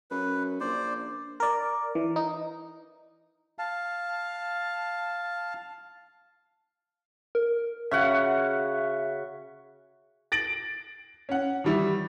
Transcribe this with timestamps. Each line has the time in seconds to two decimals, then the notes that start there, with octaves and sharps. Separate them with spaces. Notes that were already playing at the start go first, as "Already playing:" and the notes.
0.11 F#2 B4
0.60 A#1 C5 D5
1.40 A#4 D5
1.95 E3
2.16 D#4
3.59 F5 A5
7.35 A#4
7.91 C#3 F#4 E5 F#5
10.32 A6 A#6 D7 F#7
11.29 C#4 F#5
11.64 D#3 E3 G3 E4